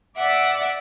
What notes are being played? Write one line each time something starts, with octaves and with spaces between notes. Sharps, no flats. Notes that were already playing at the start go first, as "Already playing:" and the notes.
D5 E5 F#5 D6